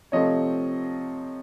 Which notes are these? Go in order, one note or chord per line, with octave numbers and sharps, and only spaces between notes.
C3 F3 A3 C4 C#5 D#5